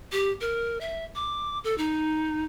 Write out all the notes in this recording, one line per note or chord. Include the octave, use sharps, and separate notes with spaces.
G4
A#4
E5
D6
A4
D#4